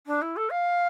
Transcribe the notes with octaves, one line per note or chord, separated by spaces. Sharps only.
D4
E4
A4
F5